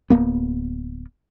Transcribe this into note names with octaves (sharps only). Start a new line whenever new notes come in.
D1 F2 A#3 B3